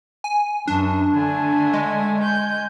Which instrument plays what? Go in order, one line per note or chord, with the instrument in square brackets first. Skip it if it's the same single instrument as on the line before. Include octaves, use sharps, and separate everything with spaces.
[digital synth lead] G#5
[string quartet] F#2 [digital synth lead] D4
[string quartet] D3 A3 G#5
[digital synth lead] G#3
[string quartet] G#5 G6